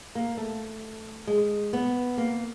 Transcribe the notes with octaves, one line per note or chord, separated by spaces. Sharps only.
A#3
A3
G#3
B3
A#3